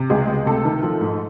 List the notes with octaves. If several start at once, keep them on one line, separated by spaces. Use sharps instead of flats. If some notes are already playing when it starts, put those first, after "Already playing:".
Already playing: C3
C#2 G#3 G#4
C#2
C3 A3 A4
D#3
F3
G#2